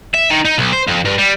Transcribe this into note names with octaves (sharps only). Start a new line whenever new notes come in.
E5
D#3
D#4
B1
C5
F2
G2
G3